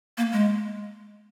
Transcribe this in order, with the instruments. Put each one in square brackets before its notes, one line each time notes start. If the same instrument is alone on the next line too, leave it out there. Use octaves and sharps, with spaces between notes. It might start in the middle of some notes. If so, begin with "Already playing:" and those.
[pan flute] A#3
G#3